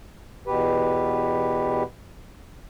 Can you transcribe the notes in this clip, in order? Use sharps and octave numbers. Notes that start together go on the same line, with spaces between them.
E2 B2 G4 B4